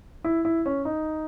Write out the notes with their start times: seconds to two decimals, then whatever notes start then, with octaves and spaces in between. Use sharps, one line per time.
0.24 E4
0.45 E4
0.66 C#4
0.85 D#4